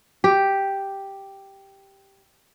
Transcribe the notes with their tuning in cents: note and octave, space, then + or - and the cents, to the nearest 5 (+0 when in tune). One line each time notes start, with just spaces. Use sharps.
G4 +0